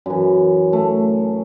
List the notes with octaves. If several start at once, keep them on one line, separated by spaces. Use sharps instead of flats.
F#2 E3
A3